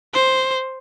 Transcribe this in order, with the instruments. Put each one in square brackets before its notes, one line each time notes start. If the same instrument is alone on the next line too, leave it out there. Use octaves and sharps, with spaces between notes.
[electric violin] C5